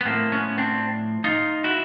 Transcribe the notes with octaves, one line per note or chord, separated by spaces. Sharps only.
B3
A2 F3 A#3 C4
B3 C#4
C4 D4
D#4 F4
E4 F#4